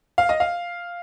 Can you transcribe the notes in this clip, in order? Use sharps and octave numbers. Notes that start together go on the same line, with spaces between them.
F5
D#5
F5